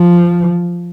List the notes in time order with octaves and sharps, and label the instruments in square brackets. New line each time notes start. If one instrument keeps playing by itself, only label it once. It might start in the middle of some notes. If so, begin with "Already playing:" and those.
Already playing: [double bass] F3